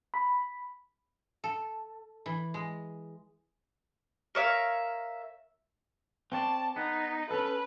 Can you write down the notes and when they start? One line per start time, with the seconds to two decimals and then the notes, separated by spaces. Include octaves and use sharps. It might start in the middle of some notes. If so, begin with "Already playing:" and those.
0.14 B5
1.44 A4
2.26 E3
2.54 G#3
4.35 A#4 C#5 E5 F5
6.32 C4 C#5 D5 A5
6.76 B3 D#4
7.31 C#4 A4 B4